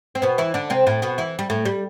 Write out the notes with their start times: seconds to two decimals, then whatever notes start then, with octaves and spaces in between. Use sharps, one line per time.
0.15 C4
0.22 B2 B3
0.38 E3 E4
0.54 D3 D4
0.70 C3 C4
0.87 A2 A3
1.02 B2 B3
1.18 E3 E4
1.39 G3
1.50 A2 A3
1.65 G3